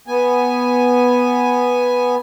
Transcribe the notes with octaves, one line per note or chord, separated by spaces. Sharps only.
B3 G#5